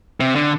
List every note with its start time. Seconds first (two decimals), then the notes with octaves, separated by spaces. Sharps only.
0.20 C3
0.35 D3